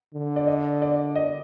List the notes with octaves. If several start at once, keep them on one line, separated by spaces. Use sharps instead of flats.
D3
D5
D#5
D5
D#5